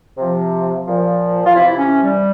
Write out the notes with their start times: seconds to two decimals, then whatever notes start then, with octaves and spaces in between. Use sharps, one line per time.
0.18 C3 F3
0.86 A#2 F3
1.46 F4
1.55 C3 E3 E4
1.77 C#4
2.01 G3